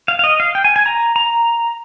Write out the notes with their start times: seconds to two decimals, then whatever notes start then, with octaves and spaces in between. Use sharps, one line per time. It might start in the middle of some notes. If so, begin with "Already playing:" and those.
0.08 F5
0.19 F5
0.24 D#5
0.40 F5
0.55 G5
0.64 G#5
0.76 G#5
0.86 A#5
1.16 A#5